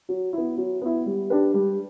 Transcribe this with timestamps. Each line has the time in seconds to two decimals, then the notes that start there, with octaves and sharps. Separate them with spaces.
0.09 F#3
0.33 B3 E4
0.57 F#3
0.81 B3 E4
1.06 G3
1.30 D4 G4 B4
1.54 G3